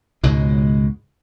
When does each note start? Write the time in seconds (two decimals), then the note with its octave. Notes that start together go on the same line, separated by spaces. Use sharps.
0.23 C#2 G#2 B2 G#3